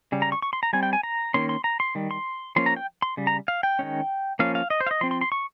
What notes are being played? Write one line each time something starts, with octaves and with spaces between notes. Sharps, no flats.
C#3 G3
A#5
C#6
C#6
C6
A#5
G3 C4 G#5
G5
G#5
A#5
D#3 A#3 C#4 C6
C6
A#5
C6
D#3 G3
C6
F3 A#3 C#4 C6
A#5
G5
C6
C#3 G3
A#5
F5
G5
D#3 G#3 C#4
F3 A#3 C#4 F5
F5
D#5
C5
F5
D#5
F3 C4 C6
C6
C6
C#6